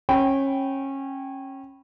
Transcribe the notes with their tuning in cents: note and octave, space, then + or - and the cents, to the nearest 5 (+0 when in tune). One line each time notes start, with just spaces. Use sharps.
C#4 -25 G5 -20 B5 +0